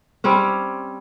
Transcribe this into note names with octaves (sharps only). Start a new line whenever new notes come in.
G3 C4 C#4